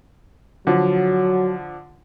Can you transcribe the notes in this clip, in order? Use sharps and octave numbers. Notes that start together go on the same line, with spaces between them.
D3 F3 F#3